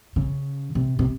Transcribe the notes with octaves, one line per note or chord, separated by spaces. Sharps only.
C#3
C3
C3